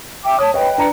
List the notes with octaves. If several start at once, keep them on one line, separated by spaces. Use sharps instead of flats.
E5 G5 D6
C#5 A5 D#6
B4 C#5 D#5 G5
D4 A#5 C#7